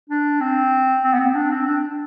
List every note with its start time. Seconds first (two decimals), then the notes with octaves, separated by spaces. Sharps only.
0.10 D4
0.41 C4
1.04 C4
1.14 B3
1.20 C4
1.35 D4
1.51 C4
1.67 D4